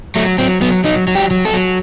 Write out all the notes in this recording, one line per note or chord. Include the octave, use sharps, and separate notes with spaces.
F#3 A3
F#3 C4
F#3 B3
F#3 D#4
F#3
G4
F#3
A4
F#3